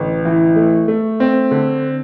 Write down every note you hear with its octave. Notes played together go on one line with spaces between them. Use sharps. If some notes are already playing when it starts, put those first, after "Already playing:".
Already playing: A1 D3
E3
A3
A3
C4
D3